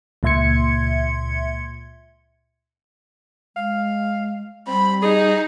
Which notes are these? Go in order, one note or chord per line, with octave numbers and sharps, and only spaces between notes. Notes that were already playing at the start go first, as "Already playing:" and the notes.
C#2 A#2 E5 C6 G#6 C#7
G#3 F5
G3 C4 B5
D#4 G#4